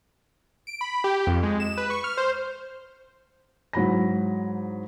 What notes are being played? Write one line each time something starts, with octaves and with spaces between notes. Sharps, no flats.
D7
B5
G4
F2
G#3
E7
B4
C#6
F6
C5
G#2 F#3 E4 B5 A#6